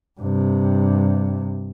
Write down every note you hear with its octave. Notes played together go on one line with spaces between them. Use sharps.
G2 C3